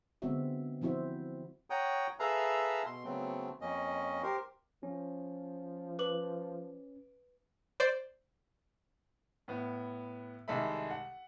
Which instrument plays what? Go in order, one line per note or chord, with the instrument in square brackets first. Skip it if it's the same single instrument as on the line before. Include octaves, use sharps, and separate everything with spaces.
[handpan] D3 G#3 B3 C4 F#4 E5
F3 C4 E4 F#4 C5 E5
[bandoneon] C#5 F#5 G5 A#5 D#6
G#4 A4 B4 E5 F5 A#5
B2 C6
C#3 F#3 A3 B3 C4
F2 A#3 C#4 D#5
G4 A#4 C5
[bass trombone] F3 [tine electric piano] C#4
[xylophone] B4 D6 F#7
[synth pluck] C5 D5
[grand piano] A2 B3
C2 D#3 G#3 A4 E5 B5
F#5